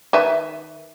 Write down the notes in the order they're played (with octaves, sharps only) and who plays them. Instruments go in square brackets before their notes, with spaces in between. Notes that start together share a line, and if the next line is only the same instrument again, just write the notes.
[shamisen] D#3 B4 E5